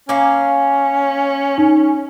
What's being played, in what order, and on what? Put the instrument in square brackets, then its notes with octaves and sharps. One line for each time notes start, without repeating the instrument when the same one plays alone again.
[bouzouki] A#3 F5 [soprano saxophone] C#4
[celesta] D#4